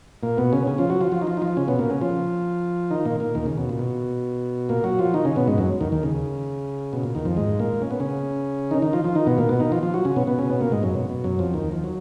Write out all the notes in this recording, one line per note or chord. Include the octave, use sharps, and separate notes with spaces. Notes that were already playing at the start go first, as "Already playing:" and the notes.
A#2 A#3
B2 B3
C#3 C#4
C#3 C#4
F3 F4
F#3 F#4
F3 F4
F3 F4
D#4
F3 F4
D#4
F3 F4
C#3 C#4
B2 B3
A#2 A#3
C#3 C#4
F3 F4
D#3 D#4
A#2 A#3
A#2 A#3
D#2 D#3
C#3
B2
A#2
B2
A#2 A#3
F#3 F#4
F3 F4
D#3 D#4
C#3 C#4
B2 B3
G#2 G#3
F#2 F#3
D#2 D#3
D#2 D#3
C#3
B2
A#2
D#2 D#3
F2 F3
G#2 G#3
A#2 A#3
C#4
B3
C#3 C#4
D#3 D#4
D#3 D#4
F3 F4
F3 F4
D#3 D#4
B2 B3
A#2 A#3
B2 B3
D#3 D#4
F3 F4
F3 F4
F#3 F#4
C#3 C#4
B2 B3
B2 B3
C#3 C#4
B2 B3
A#2 A#3
G#2 G#3
F#2 F#3
B2
B2
F#2 F#3
F2 F3
D#2 D#3
F3
F#3